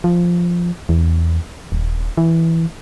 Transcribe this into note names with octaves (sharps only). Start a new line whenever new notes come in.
F3
E2
D#1
E3